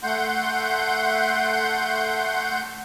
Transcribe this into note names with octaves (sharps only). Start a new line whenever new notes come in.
A3 F#5 C6 G6